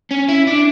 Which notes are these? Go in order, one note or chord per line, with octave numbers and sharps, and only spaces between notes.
C#4
E4
D4